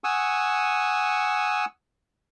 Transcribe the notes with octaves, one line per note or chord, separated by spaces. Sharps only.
F#5 G#5 C#6 D#6 E6